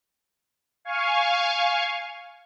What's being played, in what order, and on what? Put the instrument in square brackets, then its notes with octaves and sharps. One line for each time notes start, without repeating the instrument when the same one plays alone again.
[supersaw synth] F5 G#5 C#6